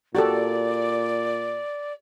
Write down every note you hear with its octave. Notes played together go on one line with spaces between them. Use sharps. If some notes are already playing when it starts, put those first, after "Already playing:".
A#2 F#4 G4 A4 D5